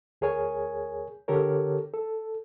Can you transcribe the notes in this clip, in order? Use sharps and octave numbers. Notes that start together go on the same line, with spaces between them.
D2 G#4 A#4 C#5 G#5
D3 G4 A4 A#4 C#5
A4